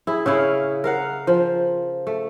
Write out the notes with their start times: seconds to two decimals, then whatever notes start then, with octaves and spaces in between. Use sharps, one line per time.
0.07 E4 G#4
0.26 C#3 C#4 E4 F5
0.84 A#4 F5 F#5
1.27 F3
2.07 A3